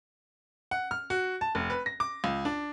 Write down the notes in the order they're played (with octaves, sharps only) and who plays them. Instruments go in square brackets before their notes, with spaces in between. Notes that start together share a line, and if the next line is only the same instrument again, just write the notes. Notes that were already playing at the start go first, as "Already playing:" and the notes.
[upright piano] F#5
F6
F#4
A5
F1
B4
A#6
D6
C#2
D4